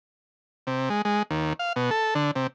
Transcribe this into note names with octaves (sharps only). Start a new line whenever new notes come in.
C3
G#3
G#3
D#2
F5
B2
A4
D3
C3